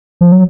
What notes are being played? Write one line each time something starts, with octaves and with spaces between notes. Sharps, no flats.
F3
F#3